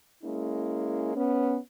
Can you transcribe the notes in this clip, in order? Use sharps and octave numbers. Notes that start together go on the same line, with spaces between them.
G#3 A#3 C#4 E4
B3 C#4